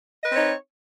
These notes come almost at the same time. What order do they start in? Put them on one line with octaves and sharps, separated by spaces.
D#5 B4 C4 C#5 D#4